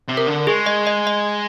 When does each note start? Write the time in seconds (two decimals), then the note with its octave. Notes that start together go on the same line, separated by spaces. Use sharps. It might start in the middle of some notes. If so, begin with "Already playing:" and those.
0.08 C3
0.17 A#4
0.27 D3
0.47 G#3 G#4
0.66 D#5
0.87 D#5
1.07 D#5